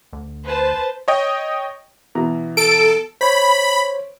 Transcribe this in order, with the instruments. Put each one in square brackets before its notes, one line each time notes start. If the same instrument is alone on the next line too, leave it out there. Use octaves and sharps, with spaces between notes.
[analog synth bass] D2
[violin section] B4 C5 A5
[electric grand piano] C#5 D#5 G5
[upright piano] B2 E3 A#5
[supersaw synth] A4 [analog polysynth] D7
[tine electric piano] C5 C#5 [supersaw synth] B5